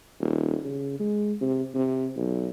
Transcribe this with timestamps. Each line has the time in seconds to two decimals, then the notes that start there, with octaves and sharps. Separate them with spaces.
0.20 D#1
0.65 C#3
0.99 G#3
1.41 C3
1.74 C3
2.16 B1